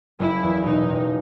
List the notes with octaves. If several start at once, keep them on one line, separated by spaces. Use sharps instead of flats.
F#1 E4
E2
B2 D#4
F#1